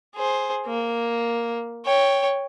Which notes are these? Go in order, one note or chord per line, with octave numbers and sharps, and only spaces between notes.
G#4 C5
A#3
C#5 G5